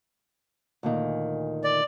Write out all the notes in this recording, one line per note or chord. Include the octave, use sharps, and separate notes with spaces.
D2 A#2 D#3
D5